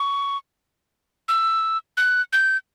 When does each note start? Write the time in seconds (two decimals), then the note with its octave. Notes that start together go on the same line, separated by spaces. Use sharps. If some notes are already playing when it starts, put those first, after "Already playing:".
Already playing: C#6
1.28 E6
1.97 F#6
2.33 G6